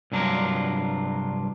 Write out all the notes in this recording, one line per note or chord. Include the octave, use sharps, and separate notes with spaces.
C2 G2 F#3 D4 F4 A#4